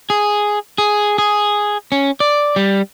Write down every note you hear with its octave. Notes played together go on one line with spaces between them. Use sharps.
G#4
G#4
G#4
C#4
D5
G3